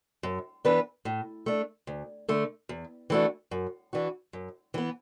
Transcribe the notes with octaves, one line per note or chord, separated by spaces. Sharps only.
F#2
E3 B3 D4 B4
A2
A3 D4
D2
D3 A3
E2
E3 A3 D4 F#4
F#2
E3 D4 F#4
F#2
E3 B3